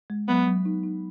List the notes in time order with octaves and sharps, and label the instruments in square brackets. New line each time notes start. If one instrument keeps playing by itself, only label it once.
[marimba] G#3
[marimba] F#3 [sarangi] B3
[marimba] F#3
D#4
D#4